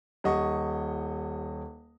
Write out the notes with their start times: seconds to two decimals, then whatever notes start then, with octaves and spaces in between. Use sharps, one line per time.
0.24 D#1 G4 D#5 F#5 C#6